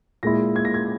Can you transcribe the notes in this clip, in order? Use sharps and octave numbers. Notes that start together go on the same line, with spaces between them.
A#2 G#3 E4 A#6
G#6
A#6
G#6